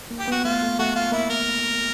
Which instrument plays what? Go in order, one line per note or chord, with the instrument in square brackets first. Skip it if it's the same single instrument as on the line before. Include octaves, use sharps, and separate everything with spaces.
[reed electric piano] A#3
[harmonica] G4
[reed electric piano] B3 [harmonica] F#4
[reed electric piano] A3 [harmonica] F4
[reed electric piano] A3
[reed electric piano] A3 [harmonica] F#4
[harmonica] F4
[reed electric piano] A#3 [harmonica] E4
[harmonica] A#4